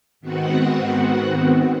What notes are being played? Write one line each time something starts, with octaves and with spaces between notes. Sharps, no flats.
G#2 D#3 B3 C4 F#4 F#5